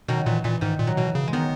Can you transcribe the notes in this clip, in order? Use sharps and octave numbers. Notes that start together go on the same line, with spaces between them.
B2 D#3 F#3
A#2 E3
A#2 E3
G#2 D#3
A#2
F#3
B2 E3
C#3
G#3
D#3 F#3 B3